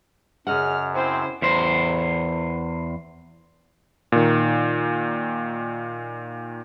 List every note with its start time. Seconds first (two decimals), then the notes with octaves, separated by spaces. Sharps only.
0.47 F#2 C#3 G#4 D#5 F#5 F6
0.94 C4 E4 C5
1.42 E2 C5
4.12 A#2 D#3